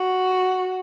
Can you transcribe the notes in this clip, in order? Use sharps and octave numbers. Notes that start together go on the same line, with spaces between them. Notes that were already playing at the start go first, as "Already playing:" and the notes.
Already playing: F#4